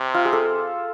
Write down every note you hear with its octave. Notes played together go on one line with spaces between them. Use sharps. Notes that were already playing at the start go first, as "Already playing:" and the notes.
Already playing: C3
F4
G#4
A4